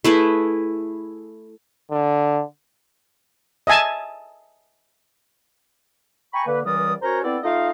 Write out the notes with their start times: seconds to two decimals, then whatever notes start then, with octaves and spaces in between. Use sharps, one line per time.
0.04 A3 E4 G#4 B4
1.91 D3
3.67 D#5 E5 G#5 A5
6.33 G5 G#5 A#5 B5 C#6
6.46 D3 A#3 B4
6.65 C#2 E3 G3 A#4 D5 D#6
7.01 C#4 F#4 A#4 C5 C#5 A#5
7.23 B3 C4 E4 A4 D5
7.43 A3 D#4 F4 D#5 F5